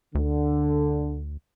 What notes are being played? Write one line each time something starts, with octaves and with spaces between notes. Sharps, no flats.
D2 D3